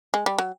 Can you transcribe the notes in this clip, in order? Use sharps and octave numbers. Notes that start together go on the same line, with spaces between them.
G#3
G3
F#3